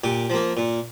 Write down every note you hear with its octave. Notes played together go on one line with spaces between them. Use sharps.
A#2 G4
F3 A#3
A#2